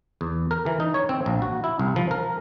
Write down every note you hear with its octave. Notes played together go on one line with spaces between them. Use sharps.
E2
A#4
E3
D#4
C#5
C4
A#1
F#4
E4
C2
F3
A#4